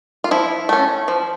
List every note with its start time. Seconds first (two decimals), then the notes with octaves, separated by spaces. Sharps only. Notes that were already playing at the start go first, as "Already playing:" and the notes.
0.24 F4
0.31 F3 E4
0.69 A3 C#4
1.08 F3